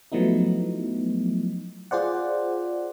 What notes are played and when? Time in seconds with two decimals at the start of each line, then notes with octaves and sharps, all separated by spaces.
0.12 F3 F#3 A3 B3 D#4 E4
1.91 F4 G#4 C5 D5 F#5